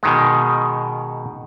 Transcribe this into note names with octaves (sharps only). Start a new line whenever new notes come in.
B2 D#3 G#3